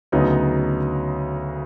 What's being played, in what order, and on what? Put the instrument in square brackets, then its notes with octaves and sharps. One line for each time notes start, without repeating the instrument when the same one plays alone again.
[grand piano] D2 C#3 F#3 B3 D#4